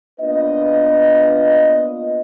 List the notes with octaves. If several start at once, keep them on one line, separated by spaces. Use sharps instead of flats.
A#3 B3 D4 F4 B4 D#5